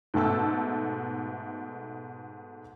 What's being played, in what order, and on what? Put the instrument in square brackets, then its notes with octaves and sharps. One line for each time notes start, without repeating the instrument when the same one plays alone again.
[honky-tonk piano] G#2 B2 A3 A5 E6